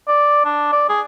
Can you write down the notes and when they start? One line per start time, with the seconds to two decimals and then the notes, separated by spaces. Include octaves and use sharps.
0.08 D5
0.45 D4
0.73 D5
0.89 G#4